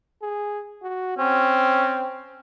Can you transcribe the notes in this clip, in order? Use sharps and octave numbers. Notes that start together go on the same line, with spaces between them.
G#4
F#4
C4 C#4